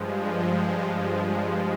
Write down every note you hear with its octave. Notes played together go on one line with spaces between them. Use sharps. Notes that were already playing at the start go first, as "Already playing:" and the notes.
Already playing: G2 F3 G#3